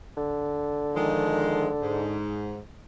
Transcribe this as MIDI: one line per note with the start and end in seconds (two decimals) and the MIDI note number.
0.17 2.23 50
0.95 1.67 51
0.95 1.67 53
0.95 1.67 56
1.81 2.57 44